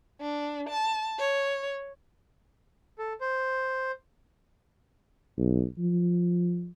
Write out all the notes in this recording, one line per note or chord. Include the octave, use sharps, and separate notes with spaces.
D4
A5
C#5
A4
C5
B1
F3